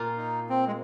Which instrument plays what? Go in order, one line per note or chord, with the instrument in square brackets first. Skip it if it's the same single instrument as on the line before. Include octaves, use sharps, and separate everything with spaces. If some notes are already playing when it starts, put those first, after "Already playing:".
Already playing: [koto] A#2 A#3 F4
[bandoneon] D#4
C4
G#3